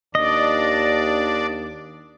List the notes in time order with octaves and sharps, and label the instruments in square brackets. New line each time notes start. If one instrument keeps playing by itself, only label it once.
[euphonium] D#2 [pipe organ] D4 D5 [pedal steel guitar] D#5